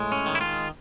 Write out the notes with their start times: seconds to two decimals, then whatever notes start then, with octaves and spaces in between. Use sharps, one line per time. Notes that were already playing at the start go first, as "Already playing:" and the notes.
Already playing: A2 G#3
0.12 C#4
0.26 D#3
0.35 E4
0.41 F4